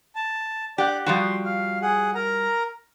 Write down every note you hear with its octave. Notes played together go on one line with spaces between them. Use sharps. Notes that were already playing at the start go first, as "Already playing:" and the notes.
A5
G4 D5 F#5
F3 G3 F#4 C6
F5
G#4 F#5
A#4 A#5